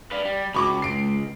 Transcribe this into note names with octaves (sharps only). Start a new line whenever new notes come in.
B4 D5 F5
G3
C#2 F#4 B5 C#6 D6
G#3 C7 D7